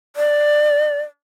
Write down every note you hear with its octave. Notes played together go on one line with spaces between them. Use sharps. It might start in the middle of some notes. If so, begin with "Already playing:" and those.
D5